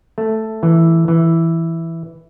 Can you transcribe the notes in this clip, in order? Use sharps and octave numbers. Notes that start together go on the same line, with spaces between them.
A3
E3
E3